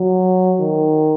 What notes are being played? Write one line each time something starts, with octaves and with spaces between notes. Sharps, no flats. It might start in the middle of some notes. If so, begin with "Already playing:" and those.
Already playing: F#3
D#3